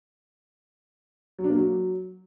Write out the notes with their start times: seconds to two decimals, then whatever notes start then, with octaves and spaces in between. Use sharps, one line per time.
1.39 F#3
1.44 D4
1.50 A#3
1.56 F#3